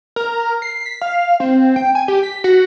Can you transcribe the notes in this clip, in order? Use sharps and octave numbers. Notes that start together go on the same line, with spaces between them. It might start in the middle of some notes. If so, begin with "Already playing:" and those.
A#4
C7
B6
F5
C4
G5
G#5
G4
B6
F#4